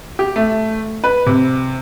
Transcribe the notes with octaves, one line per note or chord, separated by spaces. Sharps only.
G4
A3
B4
C3